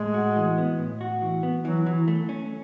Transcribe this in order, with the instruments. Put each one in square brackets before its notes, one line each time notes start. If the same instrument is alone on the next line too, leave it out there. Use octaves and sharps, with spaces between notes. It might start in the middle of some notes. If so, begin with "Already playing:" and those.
Already playing: [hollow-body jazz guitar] A2 [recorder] G#3
[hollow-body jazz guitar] F#4
E3
B3
A2
F#4
E3
B3
[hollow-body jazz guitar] E3 [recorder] F#3
[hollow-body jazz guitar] E3
A3
C#4